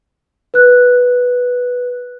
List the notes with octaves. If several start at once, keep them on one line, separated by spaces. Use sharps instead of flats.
B4 F#6